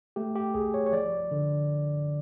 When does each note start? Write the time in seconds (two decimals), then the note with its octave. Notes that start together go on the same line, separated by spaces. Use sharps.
0.16 A3 G4
0.35 G4
0.54 C2 G#4
0.74 C#5
0.86 C#5
0.92 F3 D5
1.31 D3